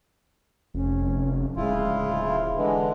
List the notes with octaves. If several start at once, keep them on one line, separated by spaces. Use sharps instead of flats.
F1 C#4
D1 C#3 G#3 E4 F4
D3 E3 G#3 D4